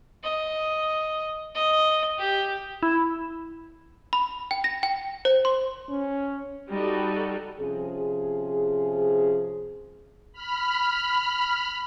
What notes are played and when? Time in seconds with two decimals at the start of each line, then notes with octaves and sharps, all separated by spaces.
0.24 D#5
1.55 D#5
2.19 G4
2.83 E4
4.13 B5
4.51 G5
4.64 A#6
4.83 G5
5.25 C5
5.45 C6
5.89 C#4
6.70 G3 D#4 F#4 A4
7.60 C3 F3 C#4 G#4
10.33 B5 F6